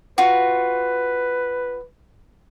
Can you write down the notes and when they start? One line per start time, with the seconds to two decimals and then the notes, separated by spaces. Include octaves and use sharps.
0.18 F4 F#4 B4